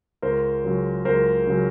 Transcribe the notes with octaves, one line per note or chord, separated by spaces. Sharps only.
C#2 A#4 C5
C#3 F#3
C#2 A#4 C5
C#3 F#3